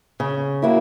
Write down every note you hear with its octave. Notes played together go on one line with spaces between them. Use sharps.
C#3
F#3 A#3 E4